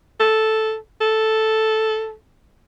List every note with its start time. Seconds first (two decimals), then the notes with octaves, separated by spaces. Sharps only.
0.20 A4
1.01 A4